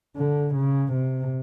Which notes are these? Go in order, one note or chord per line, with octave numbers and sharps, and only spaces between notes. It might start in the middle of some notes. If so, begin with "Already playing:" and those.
D3
C#3
C3